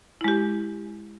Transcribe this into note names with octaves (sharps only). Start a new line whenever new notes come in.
G#3 E4 G4